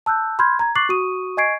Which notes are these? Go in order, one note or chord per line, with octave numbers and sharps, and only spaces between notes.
A5 E6 F#6 G6
B5 C6 F6 G6 G#6
A#5 G#6
C#6 D6 F#6 A6 C7 F#7
F#4 C#6 D#6 D#7
D#5 G#5 C#6 G#6 C7 D7